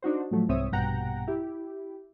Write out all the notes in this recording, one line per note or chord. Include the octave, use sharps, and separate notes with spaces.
D4 D#4 F#4 C5
A2 F3 F#3 A3
C2 G#2 C4 C#5 E5 D#6
A#1 G2 B2 F#5 G5 A#5
E4 G4